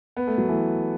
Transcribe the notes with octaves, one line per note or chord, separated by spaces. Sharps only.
B3
A3
F#3
E3 A3